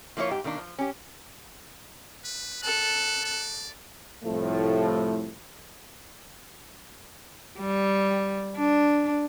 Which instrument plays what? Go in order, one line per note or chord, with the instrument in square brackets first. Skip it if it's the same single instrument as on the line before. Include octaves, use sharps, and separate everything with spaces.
[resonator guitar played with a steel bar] F3 A#3 E4 F4 C#5
G#2 G4
B2 D#3 A#3 D4
F3
C#4 G4
[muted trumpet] B4
[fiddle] A4 F#6 [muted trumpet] D5
[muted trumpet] D5
[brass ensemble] C2 A2 F3 A3
[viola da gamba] G3
D4